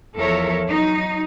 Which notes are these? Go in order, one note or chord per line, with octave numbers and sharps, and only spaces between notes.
E2 F3 A4 A#4 C#5 E5
F#3 D#4